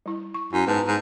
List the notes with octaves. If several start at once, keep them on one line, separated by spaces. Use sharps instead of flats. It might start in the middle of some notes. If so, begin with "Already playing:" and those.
G3 E4
C#6
F#2 E4
G#2 B3 B4 A5
G#2